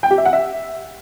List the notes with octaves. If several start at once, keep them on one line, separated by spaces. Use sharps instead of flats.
G5
G4
E5
F#5
E5